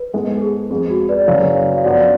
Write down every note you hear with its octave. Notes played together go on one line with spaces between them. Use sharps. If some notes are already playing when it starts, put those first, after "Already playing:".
Already playing: B4
G#2 G#3 B3 A4
A4
G#4
F2 F3 G#3 G#4
F#4
B4 D5
F#1 F#2 C#3 F#3 C#4 C#5 F5
F5
F#2 F3 B3 D4 D5 F#5